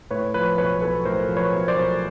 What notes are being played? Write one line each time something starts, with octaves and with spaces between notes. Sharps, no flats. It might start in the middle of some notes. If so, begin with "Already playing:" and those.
A2 B4 C#5
F3 B4 C#5
B1 B4 C#5
B1 A4 B4
A2 A#4 C5
F3
B4 C#5
B1
C5 D5
B1